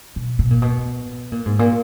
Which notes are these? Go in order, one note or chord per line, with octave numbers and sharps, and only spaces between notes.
B2
B2
A#2
B2
A#2
G#2
A#2